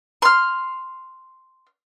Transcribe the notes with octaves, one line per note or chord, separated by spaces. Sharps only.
C6 F6